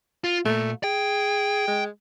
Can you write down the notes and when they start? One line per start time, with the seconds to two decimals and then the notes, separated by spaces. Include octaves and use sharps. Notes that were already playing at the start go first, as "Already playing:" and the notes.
0.24 F4
0.45 A#2 A3
0.84 G#4 G5
1.67 G#3